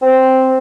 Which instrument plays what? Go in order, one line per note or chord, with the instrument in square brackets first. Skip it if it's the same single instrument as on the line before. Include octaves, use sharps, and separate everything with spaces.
[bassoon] C4